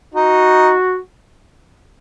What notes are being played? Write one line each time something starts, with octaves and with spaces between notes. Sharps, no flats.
D#4 F#4